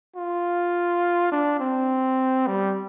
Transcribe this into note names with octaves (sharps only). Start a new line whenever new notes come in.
F4
D4
C4
G3